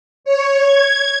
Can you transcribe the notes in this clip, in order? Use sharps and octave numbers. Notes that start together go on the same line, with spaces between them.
C#5
G#6